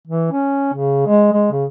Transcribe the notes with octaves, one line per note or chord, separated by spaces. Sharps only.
E3
C#4
C#3
G#3
G#3
C#3